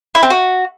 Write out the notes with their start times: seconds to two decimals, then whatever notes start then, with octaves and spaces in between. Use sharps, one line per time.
0.15 E4
0.23 C4
0.30 F#4